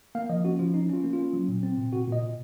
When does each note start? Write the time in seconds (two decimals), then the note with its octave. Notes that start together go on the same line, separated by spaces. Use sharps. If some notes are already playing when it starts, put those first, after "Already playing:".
0.15 A#3 F5
0.29 F3 D#5
0.44 C#4 F#4
0.59 F3 F4
0.74 C#4 D#4
0.90 C#4 F4
1.04 A#3
1.13 F4
1.19 C#4
1.33 F#3
1.48 A#2
1.63 C4
1.77 A#2
1.93 A#2 F#4
2.07 A#2 D#5
2.22 A#2